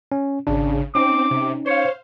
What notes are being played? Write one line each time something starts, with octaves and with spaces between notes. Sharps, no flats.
C#4
G#1 C#3 D4
C4 C#4 D#4 D6
C3
C5 C#5 F5